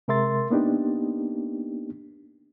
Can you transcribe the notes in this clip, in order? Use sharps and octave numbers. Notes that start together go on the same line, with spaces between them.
C3 G#3 A#4 E5 C6 A6
A#3 B3 D4 D#4 G4